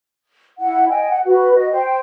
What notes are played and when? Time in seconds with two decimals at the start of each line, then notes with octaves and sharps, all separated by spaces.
0.60 E4 F#5
0.89 D#5 G5 G#5
1.09 F#5
1.25 F#4 B4
1.55 F#4 D#5
1.71 C5 G5